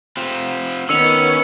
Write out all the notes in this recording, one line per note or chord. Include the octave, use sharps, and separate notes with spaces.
C4 F4 G4
D#3 B3 C#4 C#5 E6 C#7 F7